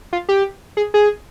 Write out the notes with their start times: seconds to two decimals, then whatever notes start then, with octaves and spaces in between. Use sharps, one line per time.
0.13 F4
0.29 G4
0.77 G#4
0.94 G#4